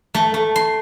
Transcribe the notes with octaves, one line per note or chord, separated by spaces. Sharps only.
A3
A3
C6